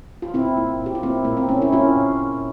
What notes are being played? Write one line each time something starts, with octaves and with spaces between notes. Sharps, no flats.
F4
A#2 C4 E4
A#3
A#2
G4
F4
A#3 C4 E4
A#2 A#3
C4
A#3 C#4
E4
A#3 C#4 F4
A#2
A#2